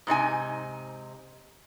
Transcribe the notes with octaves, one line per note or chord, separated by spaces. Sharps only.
G#2 C3 D#4 G#5